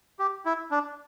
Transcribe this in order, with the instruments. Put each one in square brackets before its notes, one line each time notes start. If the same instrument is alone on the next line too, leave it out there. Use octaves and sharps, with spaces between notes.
[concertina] G4
E4
D4